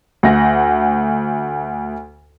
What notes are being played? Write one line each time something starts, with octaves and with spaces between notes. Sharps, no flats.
D2 F#5 A#6